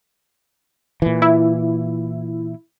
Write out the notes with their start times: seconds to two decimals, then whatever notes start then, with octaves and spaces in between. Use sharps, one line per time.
1.02 A#2 E3
1.22 E4